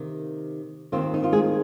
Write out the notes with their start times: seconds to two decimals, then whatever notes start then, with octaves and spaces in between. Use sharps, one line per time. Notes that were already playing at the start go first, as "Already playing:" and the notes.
Already playing: C3 D#3 A#3
0.92 D#2 D#3 C4 F4
1.14 D#4
1.24 F4
1.32 G#3 G#4